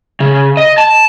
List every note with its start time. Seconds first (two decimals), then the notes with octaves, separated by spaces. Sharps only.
0.20 C#3
0.57 D#5
0.78 A5